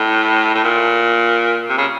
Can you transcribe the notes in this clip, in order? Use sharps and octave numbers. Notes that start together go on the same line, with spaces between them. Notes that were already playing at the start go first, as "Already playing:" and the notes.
Already playing: A2
A2
A#2
C3
C#3